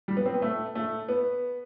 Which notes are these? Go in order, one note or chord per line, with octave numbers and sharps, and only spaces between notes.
G3
B3
C4
B3
A3
A3
B3